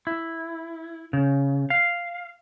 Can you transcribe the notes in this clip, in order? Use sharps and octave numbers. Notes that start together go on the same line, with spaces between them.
E4
C#3
F5